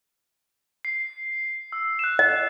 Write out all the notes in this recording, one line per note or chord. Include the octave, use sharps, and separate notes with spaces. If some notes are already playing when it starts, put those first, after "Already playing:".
C7
E6
F#6 E7
D#5